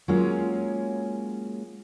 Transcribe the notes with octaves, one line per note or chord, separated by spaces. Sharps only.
F#3 G#3 A#3 C#4 F4 G#4